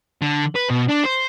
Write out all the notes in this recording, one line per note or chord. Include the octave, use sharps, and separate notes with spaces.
D3
B4
B2
D4
C5